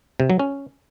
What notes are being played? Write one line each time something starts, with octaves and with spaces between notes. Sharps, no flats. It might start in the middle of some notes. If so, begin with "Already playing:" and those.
C3
F#3
C#4